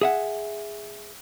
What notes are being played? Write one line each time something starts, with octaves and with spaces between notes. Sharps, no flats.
G#4 E5 F#5